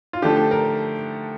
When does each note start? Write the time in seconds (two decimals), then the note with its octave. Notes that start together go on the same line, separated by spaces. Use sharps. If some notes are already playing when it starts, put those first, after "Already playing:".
0.13 F4
0.22 D3 F3 A3 D4 G4
0.51 A#4